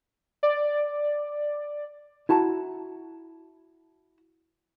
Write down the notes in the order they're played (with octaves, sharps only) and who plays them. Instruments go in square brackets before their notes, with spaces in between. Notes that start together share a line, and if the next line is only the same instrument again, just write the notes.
[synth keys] D5
[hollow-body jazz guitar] E4 F#4 A5 A#5